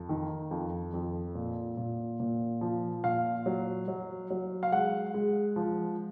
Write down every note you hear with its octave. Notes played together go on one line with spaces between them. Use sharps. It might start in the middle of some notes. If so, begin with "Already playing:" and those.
Already playing: F2
D#3
F2
F2
A#2
A#2
A#2
F3
A#2 F5
F#3
F#3
F#3
F5
G#3 F#5
G#3
F3